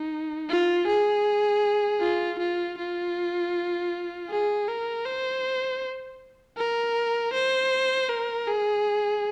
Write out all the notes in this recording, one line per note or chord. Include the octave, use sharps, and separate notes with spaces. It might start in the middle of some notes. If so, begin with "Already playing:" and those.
Already playing: D#4
F4
G#4
F4
F4
F4
G#4
A#4
C5
A#4
C5
A#4
G#4